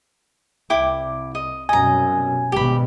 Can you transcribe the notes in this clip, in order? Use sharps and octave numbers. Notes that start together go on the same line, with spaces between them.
C2 E4 G5 D6
D#5
C2 F#2 B2 D#5 G#5 A#5
G#1 G2 B2 G4 B5